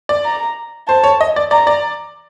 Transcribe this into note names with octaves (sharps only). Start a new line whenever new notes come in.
D5
A#5
C5 A5
C#5
D#5
D5
D5 A#5
D5